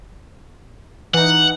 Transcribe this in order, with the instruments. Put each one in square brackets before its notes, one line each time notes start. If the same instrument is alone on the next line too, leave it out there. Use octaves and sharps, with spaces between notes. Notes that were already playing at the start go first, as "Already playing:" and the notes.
[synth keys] E3 D#4 [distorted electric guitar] F#5